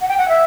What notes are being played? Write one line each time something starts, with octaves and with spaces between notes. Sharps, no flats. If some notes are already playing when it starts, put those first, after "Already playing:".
F#5
G5
F#5
E5